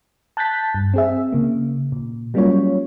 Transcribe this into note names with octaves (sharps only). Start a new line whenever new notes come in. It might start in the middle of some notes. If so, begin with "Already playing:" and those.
A5 F#6 G6 A6 B6
G2
C4 G#4 E5
C#3 A#3
A#2
F#3 G3 A#3 C#4 F4 C#5